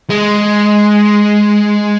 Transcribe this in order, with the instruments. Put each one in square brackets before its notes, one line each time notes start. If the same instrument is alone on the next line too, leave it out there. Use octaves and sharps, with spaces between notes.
[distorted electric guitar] G#3